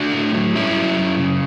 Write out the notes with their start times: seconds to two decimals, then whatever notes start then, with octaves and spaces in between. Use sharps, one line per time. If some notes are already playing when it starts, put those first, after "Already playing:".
Already playing: D3 D4 F#4
0.13 A2
0.34 F#3
0.55 G2 C#4 E4
0.76 F#3
0.97 F#2
1.18 C#3